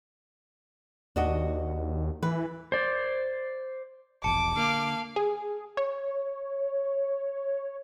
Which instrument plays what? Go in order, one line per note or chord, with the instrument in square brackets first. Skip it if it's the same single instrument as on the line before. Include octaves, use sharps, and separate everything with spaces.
[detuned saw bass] D#2 [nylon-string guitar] D4 F#4 D#5
[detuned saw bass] E3 [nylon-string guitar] B4
[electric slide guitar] C5 D5
[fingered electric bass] E1 A#1 E2 [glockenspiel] A5 C#7 [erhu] D6
[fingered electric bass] D3 [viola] A#3 F5
[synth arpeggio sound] G#4
C#5